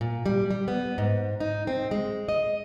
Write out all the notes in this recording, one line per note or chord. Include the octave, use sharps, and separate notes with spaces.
A#2
G3
G3
B3
G#2
D#4
C4
G#3
D#5